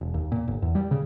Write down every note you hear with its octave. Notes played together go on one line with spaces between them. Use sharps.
E1
D#2
A#2
G1
E2
G3
C#3